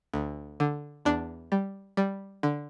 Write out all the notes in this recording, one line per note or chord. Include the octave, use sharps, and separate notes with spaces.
D2
D3
E2 D4
G3
G3
D3